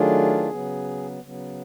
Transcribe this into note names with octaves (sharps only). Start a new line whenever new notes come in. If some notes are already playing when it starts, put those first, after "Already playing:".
Already playing: D#3 F#3 A3 D4 F4 G#4
C#3 F#3 B3
C#3 F#3 B3